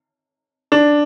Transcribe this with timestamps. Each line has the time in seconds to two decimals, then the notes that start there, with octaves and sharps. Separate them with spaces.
0.72 D4